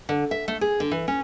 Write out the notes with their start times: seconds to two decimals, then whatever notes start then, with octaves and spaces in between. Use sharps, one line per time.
0.09 D3
0.31 E5
0.48 A3
0.61 G#4
0.80 D3
0.91 E3
1.08 C#4